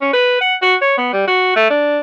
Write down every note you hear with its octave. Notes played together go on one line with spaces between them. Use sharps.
C#4
B4
F#5
F#4
C#5
B3
G3
F#4
A3
D4